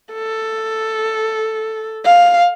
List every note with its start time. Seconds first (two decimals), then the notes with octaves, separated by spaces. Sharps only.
0.14 A4
2.05 F5